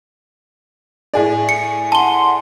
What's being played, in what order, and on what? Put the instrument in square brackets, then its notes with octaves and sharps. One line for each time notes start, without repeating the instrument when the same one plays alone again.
[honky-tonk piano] A2 G#4 D5
[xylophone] C#7
[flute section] F#5 C6 [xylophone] A5 G7